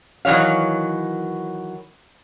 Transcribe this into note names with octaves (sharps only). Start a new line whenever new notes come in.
D#3 E3 F#3 C#5 F5